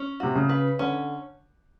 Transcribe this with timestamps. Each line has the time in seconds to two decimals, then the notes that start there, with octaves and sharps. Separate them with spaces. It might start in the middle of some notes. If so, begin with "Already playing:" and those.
Already playing: C#4
0.20 C3 F#4
0.35 C#3
0.49 B4
0.79 D3 C#4